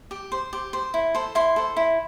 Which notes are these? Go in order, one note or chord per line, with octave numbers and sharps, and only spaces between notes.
G4
C5
G4
C5
E4
A4 C5
E4 C6
A4 C5
E4